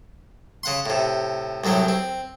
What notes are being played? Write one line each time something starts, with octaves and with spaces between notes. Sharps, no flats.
C#3 F#5 C6
A2 C3
C2 A2 F#3 C4
C4